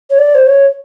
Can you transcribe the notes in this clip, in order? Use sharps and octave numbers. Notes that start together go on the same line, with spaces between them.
C#5
D5
C5
C#5